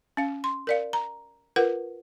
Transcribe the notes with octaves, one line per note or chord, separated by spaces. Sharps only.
C#4 F5
C6
A#4 D5 F5
A#5
F4 A#4 B4 F#5